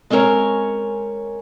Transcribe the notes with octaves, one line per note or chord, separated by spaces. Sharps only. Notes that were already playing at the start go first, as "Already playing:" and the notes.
G#3 C4 C#4 A#4 C#5